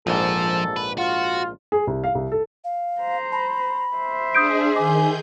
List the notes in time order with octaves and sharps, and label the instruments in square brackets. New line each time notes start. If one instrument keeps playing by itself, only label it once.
[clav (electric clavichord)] A#1 G#2 [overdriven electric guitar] F3 C5 [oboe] A4
[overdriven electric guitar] B4
[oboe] F4 [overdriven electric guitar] F#4
[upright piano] G#4
C2
F5
C2
A4
[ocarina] F5
[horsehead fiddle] C5 A#5
[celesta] A5 [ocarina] B5
[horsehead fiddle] C5 E5
[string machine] D4 G#4 [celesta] D#6 G6 D7
[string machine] D#3 G#4 G6 [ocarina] G#5 [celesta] D6